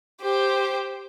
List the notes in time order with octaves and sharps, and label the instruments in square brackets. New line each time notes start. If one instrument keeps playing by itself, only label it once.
[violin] G4 C5